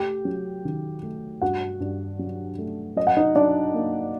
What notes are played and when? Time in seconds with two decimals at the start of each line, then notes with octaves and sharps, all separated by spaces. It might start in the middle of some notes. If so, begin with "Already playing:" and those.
Already playing: A3 G4 G5
0.25 F#3
0.65 D#3
1.03 A3
1.41 G2 F#4 F#5
1.80 G2
2.19 F#3
2.58 A3
2.96 F#3 D#5
3.07 F#5
3.17 D#4 D#5
3.35 F#3 D4 D5
3.74 A#3